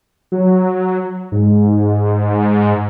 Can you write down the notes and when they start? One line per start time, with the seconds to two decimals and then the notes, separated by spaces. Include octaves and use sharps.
0.32 F#3
1.32 G#2